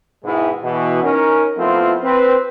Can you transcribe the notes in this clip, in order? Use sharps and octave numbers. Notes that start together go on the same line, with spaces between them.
G#2 B2 D#3 G#3 E4
B2 E3
C#4 D#4 A#4
F3 A3 B3 C4 E4 F4
C4 B4